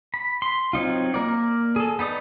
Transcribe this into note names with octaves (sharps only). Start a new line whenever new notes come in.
B5
C6
F#3 C4 D#4 F4
A#3 A#4 D5
G#4 A4
B3 D#4 D5 D#6